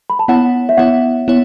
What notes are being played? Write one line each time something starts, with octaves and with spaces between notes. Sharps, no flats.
B5
A5
B3 E4 C#5 F#5
E5
B3 E4 C#5 F#5
B3 E4 C#5